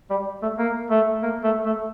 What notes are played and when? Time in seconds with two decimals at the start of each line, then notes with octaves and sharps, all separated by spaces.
0.10 G3
0.43 A3
0.58 A#3
0.90 A3
1.23 A#3
1.44 A3
1.66 A3